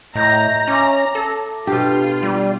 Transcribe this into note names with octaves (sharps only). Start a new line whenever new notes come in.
A2 D#5 A#5 G6 A#6
C#4 E5 D6 A#6
A4
B2 D4 F4 G4
G3